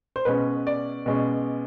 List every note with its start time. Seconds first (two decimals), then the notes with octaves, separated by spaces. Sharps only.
0.16 C5
0.25 B2 G#3 C#4 B4
0.67 D5
1.06 B2 G#3 C#4